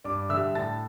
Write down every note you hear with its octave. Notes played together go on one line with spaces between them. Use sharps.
G2 D5 D6
D3 G3 E5 E6
A2 A5 A6